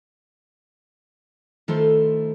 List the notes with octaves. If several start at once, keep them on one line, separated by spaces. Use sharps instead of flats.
D#3 A3 E4 F4 A4 C5